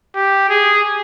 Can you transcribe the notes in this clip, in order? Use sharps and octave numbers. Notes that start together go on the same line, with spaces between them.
G4
G#4